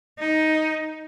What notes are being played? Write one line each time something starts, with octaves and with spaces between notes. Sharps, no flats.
D#4